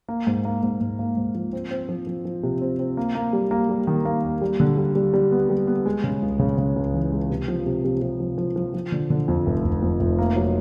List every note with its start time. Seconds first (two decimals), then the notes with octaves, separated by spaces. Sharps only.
0.08 A#3
0.27 G#2
0.45 A#3
0.63 G#2
0.81 G#2
0.99 A#3
1.17 G#2
1.35 F3
1.53 C4
1.71 C4
1.89 F3
2.07 F3
2.25 F3
2.43 C3
2.61 C4
2.79 C4
2.97 A#3
3.15 A#3
3.33 G3
3.51 A#3
3.70 G3
3.87 D#3
4.05 A#3
4.23 D#2
4.41 G3
4.60 D3
4.77 G3
4.95 G3
5.14 G3
5.32 B3
5.50 G3
5.67 B3
5.86 G#3
6.04 C#3
6.22 C#2
6.39 C#3
6.58 C#3
6.76 C#2
6.94 E3
7.12 G#3
7.30 C3
7.48 F3
7.66 C3
7.84 C3
8.02 C3
8.20 F3
8.38 F3
8.56 F3
8.74 F3
8.92 D3
9.10 D3
9.28 F2
9.46 F1
9.64 F1
9.82 F2
10.00 F1
10.18 A#3
10.36 F#3